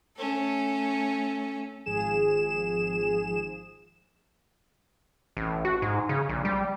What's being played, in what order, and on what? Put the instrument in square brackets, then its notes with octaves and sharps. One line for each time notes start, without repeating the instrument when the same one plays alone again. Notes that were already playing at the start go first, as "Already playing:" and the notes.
[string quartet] A3 C#4 A4
[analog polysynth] G#1 F3 G#4 E7
[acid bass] A1
F#4
G#2
C#3
A#1
G3